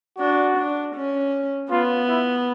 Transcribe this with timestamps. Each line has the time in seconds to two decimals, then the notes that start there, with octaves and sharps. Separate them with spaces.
0.18 D4 F#4
0.57 D4
0.95 C#4
1.71 B3 F4
2.08 E4